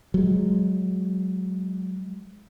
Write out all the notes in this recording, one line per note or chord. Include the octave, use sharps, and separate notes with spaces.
F#3 G#3